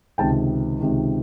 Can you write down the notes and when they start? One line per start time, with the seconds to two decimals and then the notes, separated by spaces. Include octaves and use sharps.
0.18 C#2 C3 D#3 G5 A5
0.80 C#2 C3 D#3